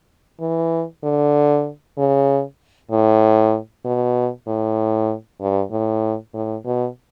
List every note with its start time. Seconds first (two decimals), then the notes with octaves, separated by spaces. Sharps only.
0.40 E3
1.03 D3
1.98 C#3
2.91 A2
3.85 B2
4.47 A2
5.40 G2
5.71 A2
6.34 A2
6.65 B2